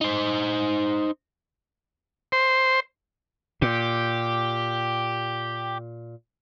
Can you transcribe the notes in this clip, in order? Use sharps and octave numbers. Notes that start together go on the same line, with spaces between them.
D#4 C5
C5
A#2 G4